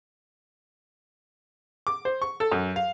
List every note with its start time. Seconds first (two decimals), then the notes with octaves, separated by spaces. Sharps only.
1.87 D6
2.05 C5
2.22 C#6
2.40 A4
2.52 F#2
2.76 F5